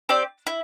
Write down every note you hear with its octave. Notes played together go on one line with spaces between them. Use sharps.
C4 G4 D5
E4